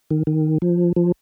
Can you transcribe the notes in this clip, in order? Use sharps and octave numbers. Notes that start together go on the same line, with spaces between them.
D#3
D#3
F3
F3